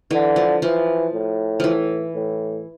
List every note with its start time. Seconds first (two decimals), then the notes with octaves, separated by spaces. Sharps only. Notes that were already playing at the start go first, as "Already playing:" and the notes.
0.11 D3 E3
0.36 F3
0.62 E3 F3
1.13 A2
1.60 E3 F3
2.15 A2